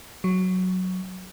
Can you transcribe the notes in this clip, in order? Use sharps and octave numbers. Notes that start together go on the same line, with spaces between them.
F#3